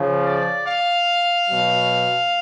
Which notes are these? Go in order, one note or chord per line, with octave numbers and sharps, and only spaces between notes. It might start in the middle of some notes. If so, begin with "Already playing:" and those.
Already playing: C#3 F3
D5
F5
B2 F#3